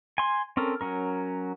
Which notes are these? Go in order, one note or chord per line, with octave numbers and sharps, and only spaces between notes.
G#5 C6
C4 C#4 A4 A#4
F#3 C#4 A#4